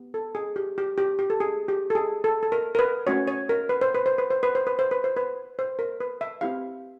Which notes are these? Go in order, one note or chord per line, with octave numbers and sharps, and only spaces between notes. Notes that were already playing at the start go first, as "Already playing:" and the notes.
Already playing: B3 G4
A4
G#4
G4
G4
G4
G4
A4
G#4
G4
A4
G#4
A4
A4
A#4
A#4
B4
A3 C#4 F#4 C#5
C#5
A#4
B4
C5
B4
C5
B4
C5
B4
C5
B4
C5
B4
C5
B4
C5
A#4
B4
E5
C4 E4 G4 F5